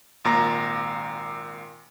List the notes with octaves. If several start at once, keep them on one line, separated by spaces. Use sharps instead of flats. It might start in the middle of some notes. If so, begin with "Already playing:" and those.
G#1 A#2 A#5 A#6